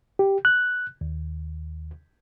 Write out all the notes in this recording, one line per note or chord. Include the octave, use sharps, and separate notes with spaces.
G4
F#6
D#2